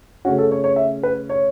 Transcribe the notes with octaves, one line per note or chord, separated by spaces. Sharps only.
C#3 A3 C#4 F#4
A4
C#5
C#5
E5
B4
C#5